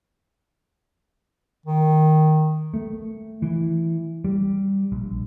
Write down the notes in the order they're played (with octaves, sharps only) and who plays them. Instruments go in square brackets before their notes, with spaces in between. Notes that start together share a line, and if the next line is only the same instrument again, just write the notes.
[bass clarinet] D#3
[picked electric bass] A3
E3
G3
A#1